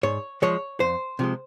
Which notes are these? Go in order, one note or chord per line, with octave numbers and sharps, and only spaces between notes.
G#2 C#5
F3 G#3 C#5
F2 C5
C3 F3 G#3